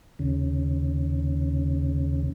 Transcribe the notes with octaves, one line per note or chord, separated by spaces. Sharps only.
D#2 C#3